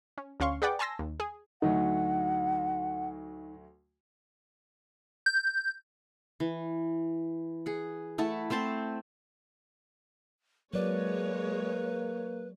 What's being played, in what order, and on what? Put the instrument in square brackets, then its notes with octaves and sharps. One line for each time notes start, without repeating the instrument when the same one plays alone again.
[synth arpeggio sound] C#4
D2 C#4 F5 C6 C#6
G#4 B4 D5 F#5 G5 D6
G#5 A5 C6 E6 A#6
D#2
G#4
[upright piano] D2 F#3 A3 [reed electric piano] D#4 [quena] F#5
[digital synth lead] G6
[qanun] E3
G#4 F#5
A3 E4 F#5 A5
A3 C4 C5 A5
[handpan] F#3 D5 [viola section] G#3 C#5 [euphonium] A#3 [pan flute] B4